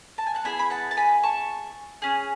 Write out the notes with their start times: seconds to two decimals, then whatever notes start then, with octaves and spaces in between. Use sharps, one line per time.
0.18 A5
0.26 G#5
0.35 F#5 A5
0.44 B3 E4 G#4 G#5 B5
0.59 B5
0.70 F#5 A5
0.91 A5
0.97 G#5 B5
1.23 A5 C#6
2.02 C#4 G#4